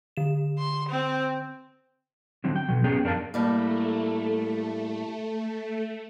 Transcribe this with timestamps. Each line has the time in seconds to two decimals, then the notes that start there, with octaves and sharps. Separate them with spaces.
0.17 D3 E7
0.59 C6
0.89 C4
2.44 D3 F#3 C4
2.56 G5
2.69 B2 F#3
2.84 B3 C#4 G#4 C#5 G5
3.04 F#2 D4 A#4 F5 A5
3.34 A2 G3 A3 A#3